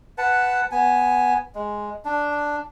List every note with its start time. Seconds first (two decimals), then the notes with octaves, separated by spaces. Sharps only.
0.18 B4 F#5 A5
0.71 B3 G#5
1.55 G#3
2.05 D4